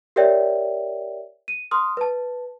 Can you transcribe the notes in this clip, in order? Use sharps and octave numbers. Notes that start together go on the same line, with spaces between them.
G4 A#4 C#5 D5 E5 G5
D#7
C6 D#6 F6
B4 A5